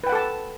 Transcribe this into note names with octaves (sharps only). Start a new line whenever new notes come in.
A4 B4 F#5 G5 A5